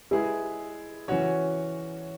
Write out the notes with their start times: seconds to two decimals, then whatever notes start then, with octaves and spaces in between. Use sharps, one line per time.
0.11 G#3 E4 G#4 B4
1.08 E3 C#4 F#4 C#5